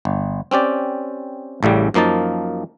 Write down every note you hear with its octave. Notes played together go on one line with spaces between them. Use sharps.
G1
C4 C#4 G4 D5
A1 A2 C#3 G3
F#2 F3 A#3 D#4 A5